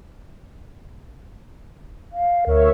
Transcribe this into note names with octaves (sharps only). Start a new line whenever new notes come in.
F5
D2 A#4 C#5 E5